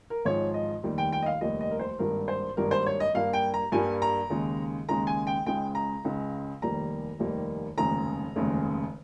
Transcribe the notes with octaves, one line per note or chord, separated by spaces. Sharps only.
A#4
G#1 G#2 F3 C#5
D#5
F1 D#2 D#3 G3
G5
G5
D#5
F5
F1 D#2 D#3 G3 D#5
D#5
A#4
C5
G#1 G2 G3 A#3 A#4
C5
G#1 G2 G3 A#3 A#4
C5
C#5
D#5
G2 G3 A#3 F5
G5
A#5
G2 G3 A#3 G#5
A#5
D#2 C#3 G#3
D#2 C#3 G#3 A#5
G#5
G5
C#2 C#3 G#3 G5
A#5
C#2 C#3 G#3
F1 D#2 D#3 G3 A#3 A#5
F1 D#2 D#3 G3 A#3
F1 D#2 C#3 G#3 A#5
F1 D#2 C#3 G#3